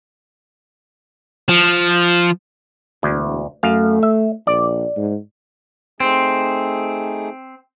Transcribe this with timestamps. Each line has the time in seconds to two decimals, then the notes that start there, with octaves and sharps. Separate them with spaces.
1.49 F3
3.03 E1 D2
3.63 F#2 A3 F5
4.03 E5
4.47 A#1 D5
4.97 G#2
6.00 A3 C4 D#4 G#4